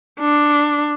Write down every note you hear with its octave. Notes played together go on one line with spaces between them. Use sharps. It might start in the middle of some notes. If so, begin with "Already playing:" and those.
D4